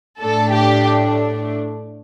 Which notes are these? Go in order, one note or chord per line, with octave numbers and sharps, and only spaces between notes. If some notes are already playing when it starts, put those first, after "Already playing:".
A2 A3 D4 A4
G4